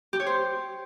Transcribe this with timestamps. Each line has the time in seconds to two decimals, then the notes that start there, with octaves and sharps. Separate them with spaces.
0.13 G4
0.20 C#5
0.27 C5